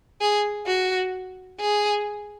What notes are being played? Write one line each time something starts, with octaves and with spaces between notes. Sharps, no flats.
G#4
F#4
G#4